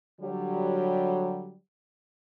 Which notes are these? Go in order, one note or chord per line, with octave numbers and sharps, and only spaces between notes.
D3 F#3 G3